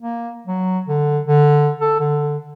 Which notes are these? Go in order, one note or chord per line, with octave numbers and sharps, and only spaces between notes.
A#3
F#3
D3
D3
A4
D3